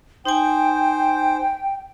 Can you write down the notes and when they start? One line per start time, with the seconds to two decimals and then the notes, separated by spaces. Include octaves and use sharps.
0.25 D#4 C5 G5 G#5